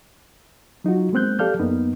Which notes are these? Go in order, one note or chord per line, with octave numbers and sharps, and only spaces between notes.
F#3 D#4 F4 F#4
G#3 A#3 C4 F#6 G6
G4 A4 D5 F5 F6 G6
F#2 A#3 B3 D#4